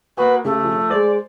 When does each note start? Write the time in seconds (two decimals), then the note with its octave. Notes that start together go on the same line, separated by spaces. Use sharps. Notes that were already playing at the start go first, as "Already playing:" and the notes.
0.17 A#3 F#4 B4 D#6
0.45 C#3 A3 G4
0.64 F3
0.90 G#3 C5 D5